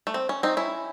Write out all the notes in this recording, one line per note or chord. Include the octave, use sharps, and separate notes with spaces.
A3
C4
C#4
C4 D#4
C#4 E4